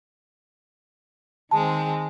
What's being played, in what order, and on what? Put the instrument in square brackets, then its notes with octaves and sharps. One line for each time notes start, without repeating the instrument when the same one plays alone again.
[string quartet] D#3 G#3 C4 [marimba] A5